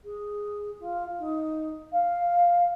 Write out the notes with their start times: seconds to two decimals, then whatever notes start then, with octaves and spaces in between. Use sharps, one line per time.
0.04 G#4
0.80 F4
1.19 D#4
1.92 F5